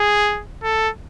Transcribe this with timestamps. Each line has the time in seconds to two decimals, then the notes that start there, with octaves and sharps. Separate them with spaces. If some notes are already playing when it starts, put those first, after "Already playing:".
Already playing: G#4
0.63 A4